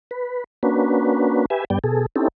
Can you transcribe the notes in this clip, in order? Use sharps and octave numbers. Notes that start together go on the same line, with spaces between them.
B4
A#3 C#4 D4 F#4 B4
G4 B4 E5 G#5
G2 G3 B3 D5 G5
B2 G#4 A4
C4 C#4 D#4 E4 G4 A4